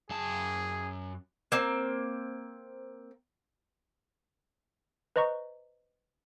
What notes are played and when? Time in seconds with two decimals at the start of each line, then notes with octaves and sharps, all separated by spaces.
0.10 F#2 G#4 A5
1.52 A#3 C4
5.16 B4 C5 D#5 A#5 C#6